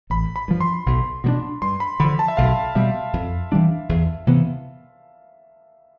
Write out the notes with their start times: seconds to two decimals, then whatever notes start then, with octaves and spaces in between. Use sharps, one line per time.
0.10 A1 B5
0.36 B5
0.48 G2 F3
0.61 C6
0.86 B1
1.24 B2 G3 D4
1.62 G2 C6
1.80 B5
2.00 D3 F3 B5
2.19 A5
2.28 E5
2.37 B1 F5
2.75 B2 G3 E5
3.13 F2
3.52 E3 G3 D4
3.89 E2
4.27 C3 E3 B3